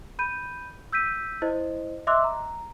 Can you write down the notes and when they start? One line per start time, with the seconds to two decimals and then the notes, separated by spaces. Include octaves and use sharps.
0.19 B5 G6 D#7
0.92 E6 G6 B6 D#7
1.42 E4 C5 D#5
2.07 D#5 E5 C6 D6 E6 F#6
2.24 A#5